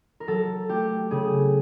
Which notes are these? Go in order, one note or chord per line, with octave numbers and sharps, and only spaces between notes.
A#4
F#3 A4
A3 G4
C#3 G#4